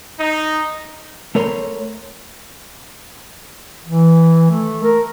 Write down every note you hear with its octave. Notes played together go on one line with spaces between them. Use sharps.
D#4
A3 A#4 C#5 B5 C6
E3
A3
A#4